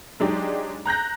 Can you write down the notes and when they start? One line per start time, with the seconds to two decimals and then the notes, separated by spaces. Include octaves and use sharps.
0.20 F#3 G#3 D4 D#4 G4
0.86 A#5 F#6 G6 A#6